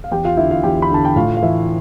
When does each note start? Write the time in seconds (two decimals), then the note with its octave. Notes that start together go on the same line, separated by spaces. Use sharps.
0.04 F5
0.11 E2 G4 G5
0.24 F4 F5
0.37 D3 E4 E5
0.50 F4 F5
0.64 E2 G4 G5
0.82 B5
0.90 D3 A5
1.05 G5
1.16 A2 F4 F5
1.37 F5
1.42 E3 E4 E5